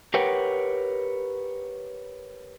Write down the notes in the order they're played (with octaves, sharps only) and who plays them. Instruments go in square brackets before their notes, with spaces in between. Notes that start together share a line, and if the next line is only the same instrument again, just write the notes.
[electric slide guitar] G4 A#4 B4 C#5 F#5 G5